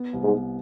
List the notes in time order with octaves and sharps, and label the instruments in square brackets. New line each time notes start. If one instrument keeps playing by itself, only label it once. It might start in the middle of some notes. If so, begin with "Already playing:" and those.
Already playing: [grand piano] B3
C2
[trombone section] G#2
[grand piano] B3